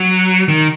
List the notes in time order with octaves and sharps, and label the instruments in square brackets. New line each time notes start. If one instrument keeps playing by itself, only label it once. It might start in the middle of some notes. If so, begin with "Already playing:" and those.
Already playing: [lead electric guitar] F#3
D#3